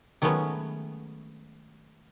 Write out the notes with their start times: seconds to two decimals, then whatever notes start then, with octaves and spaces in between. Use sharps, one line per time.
0.22 D#3 F#3 G#3 A3 B3 C#4